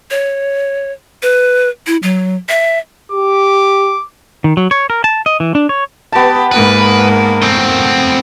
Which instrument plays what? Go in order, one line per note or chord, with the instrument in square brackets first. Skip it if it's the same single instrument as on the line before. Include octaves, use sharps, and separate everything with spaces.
[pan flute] C#5
B4
E4
F#3
E5
[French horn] G4 [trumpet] D6
[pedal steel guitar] D#3
F#3
C#5
A#4
A5
D#5
E3
D4
C#5
[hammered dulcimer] B3 A5 [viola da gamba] G4
[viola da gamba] G#2 A#3 A#4 [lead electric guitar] B4
[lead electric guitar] A3 C4